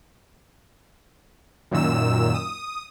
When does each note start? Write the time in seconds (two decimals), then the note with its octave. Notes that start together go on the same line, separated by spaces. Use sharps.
1.71 F#2 A#2 D#3 E6 E7
2.34 D#6